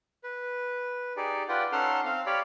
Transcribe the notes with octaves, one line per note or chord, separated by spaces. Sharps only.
B4
D#4 G4 G#4 D5
F4 B4 D5 F#5 G5
C#4 D#4 A4 F#5 C6 F6
C4 F5
G4 C#5 D5 F5 B5